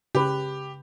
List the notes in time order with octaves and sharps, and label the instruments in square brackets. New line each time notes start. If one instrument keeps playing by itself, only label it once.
[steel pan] C#3 B4 [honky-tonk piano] G4